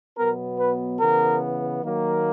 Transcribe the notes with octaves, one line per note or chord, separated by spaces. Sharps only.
B2 F#3 B3 A#4
B4
C#3 E3 B3 A#4
D#3 F#3 A#3